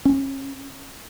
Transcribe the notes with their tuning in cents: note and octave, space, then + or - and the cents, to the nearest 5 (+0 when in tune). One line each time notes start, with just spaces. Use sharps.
C#4 -30